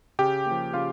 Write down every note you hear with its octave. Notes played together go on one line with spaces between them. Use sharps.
C#3 G4 G5
A#3
F3
C#3 F4 F5